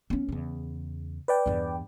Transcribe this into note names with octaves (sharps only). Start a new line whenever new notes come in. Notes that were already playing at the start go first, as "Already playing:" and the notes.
B3 C#4
E2 C#3
B4 D5 G5
E2 G2